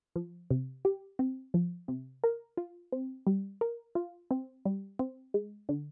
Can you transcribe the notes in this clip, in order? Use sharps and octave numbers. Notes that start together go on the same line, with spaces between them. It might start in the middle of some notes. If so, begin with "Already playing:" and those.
F3
C3
G4
C4
F3
C3
A#4
F4
C4
G3
A#4
F4
C4
G3
C4
G#3
D3